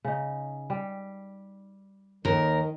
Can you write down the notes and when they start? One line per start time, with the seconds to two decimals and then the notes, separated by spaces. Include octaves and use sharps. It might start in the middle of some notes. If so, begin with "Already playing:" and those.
0.05 C#3 D#4
0.70 G3
2.25 D#2 D#3 A#4